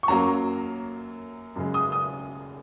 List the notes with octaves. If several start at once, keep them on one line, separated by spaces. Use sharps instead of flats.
C#6
F#2 F#3 A#3 A#5
F#2 C#3 G#3
D#6
D#6